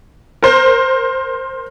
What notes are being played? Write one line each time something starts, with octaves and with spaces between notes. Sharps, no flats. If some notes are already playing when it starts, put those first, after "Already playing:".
A#4 C5